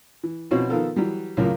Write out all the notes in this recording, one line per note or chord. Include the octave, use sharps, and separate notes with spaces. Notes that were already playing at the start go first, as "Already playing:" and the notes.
E3
B2 F3 C4 C#4 E4 F#4
D#3 F3 B3 F4 A4 A#4
E3 F#3 G3
C#2 F#2 A2 C#3 F4 A#4